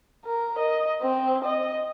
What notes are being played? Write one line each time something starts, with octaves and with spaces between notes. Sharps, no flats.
A#4
D#5
C4
D#5